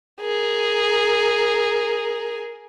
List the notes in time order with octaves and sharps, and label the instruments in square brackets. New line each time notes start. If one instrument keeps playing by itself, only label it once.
[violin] G#4 A#4